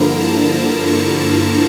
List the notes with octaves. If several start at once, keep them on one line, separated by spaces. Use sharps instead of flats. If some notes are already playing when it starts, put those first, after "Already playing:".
Already playing: G2 D3 F3 A#3 E4 A#5
A5
A5
C#6
A5